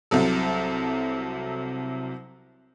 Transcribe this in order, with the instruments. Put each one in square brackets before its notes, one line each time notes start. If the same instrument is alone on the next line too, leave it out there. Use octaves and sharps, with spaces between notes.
[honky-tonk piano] C2 C3 F#3 A4